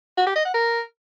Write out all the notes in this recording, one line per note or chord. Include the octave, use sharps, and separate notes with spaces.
F#4
G4
D#5
F#5
A#4